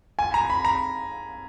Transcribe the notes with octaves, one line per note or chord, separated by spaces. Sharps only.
G#5
A#5
B5
A#5